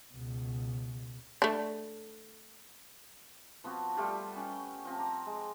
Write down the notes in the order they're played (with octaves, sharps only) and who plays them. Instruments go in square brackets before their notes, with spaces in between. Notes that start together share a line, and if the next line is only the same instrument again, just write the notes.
[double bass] C#2 B2
[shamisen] A3 D4
[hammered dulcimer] F3 B3 C4 F#4
G3 A3 F4 G4
C#4 F#5 G5
F3 C4
A#5 D6
G#3